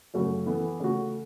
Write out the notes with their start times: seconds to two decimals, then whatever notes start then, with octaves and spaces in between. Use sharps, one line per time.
0.14 F#2 C#3 A3 F#4
0.46 E3 B3 A4
0.80 C#3 A3 F#4